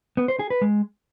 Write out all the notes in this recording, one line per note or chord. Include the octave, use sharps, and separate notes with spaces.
B3
C5
G#4
B4
G#3